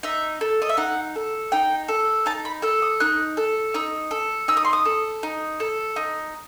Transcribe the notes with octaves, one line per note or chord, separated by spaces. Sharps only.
D#4 E5
A4
D#5
E5
D#4 F#5
A4
D#4 G5
A4
D#4 A5
B5
A4 E6
D#6
D#4 F#6
A4
D#4 E6
A4
D#4 E6
D#6
C6
D#6
A4
D#4
A4
D#4